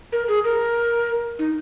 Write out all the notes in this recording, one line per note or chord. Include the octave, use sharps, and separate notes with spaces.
A#4
G#4
A#4
D#4